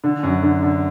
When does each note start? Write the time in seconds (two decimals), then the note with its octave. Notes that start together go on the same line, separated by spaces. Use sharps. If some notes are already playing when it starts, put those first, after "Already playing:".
0.04 D3
0.23 F#2
0.43 D3
0.63 D3